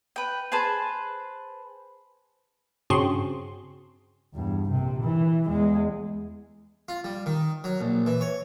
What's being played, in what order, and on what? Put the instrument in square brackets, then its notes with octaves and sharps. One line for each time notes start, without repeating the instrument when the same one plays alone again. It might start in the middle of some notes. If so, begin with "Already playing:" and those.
[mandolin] B4 G5
G#4 B4 C5 A5
[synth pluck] G2 C#3 C4 C#4 F#4 C6
[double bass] E2 G2
A#1 C3
E3
E2 G#3
[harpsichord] F4
G3
D#3
F#3
A#1
E3
C#5